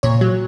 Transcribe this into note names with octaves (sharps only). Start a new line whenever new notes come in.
A#2 C#5
F#3